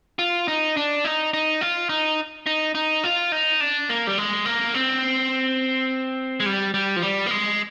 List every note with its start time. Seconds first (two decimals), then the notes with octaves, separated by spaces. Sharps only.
0.19 F4
0.48 D#4
0.77 D4
1.05 D#4
1.34 D#4
1.61 F4
1.89 D#4
2.46 D#4
2.75 D#4
3.04 F4
3.32 D#4
3.60 D4
3.89 A#3
4.07 G3
4.18 G#3
4.45 A#3
4.74 C4
6.40 G#3
6.46 G3
6.74 G3
6.96 F3
7.02 G3
7.26 A#3
7.31 G#3